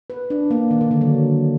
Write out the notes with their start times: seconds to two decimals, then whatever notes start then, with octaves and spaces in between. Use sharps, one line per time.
0.10 B4
0.30 D4
0.51 A#3
0.71 D#3
0.81 D#3
0.91 D3
1.01 F#3